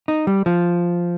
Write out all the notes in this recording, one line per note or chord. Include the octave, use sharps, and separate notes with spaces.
D#4
G3
F3